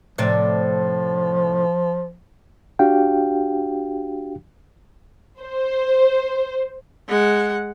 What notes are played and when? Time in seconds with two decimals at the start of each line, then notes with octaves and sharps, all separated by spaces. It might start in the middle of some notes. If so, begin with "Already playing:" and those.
0.18 A2 C3 F3 D5
2.79 D4 F#4 G4 F5 G5
5.40 C5
7.08 G#3 F#5